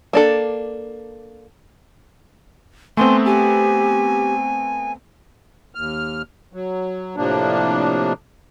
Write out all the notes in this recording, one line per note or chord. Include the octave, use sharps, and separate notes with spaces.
A#3 D4 A4
A3 B3 C4 G#5 C6
G4 G#5
D#2 F6
F#3
A2 C3 F3 A#3 D4